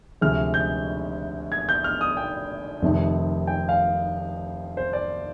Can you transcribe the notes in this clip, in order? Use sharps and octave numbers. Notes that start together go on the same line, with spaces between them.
D2 C3 F3 G#3 F6
G6
G#6
G6
F6
D#6
G5
F1 F2 C3 D#3
G5
F5
C5
D5